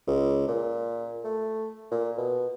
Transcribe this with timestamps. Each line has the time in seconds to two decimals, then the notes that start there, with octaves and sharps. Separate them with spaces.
0.07 C#2
0.48 A#2
1.24 A3
1.91 A#2
2.18 B2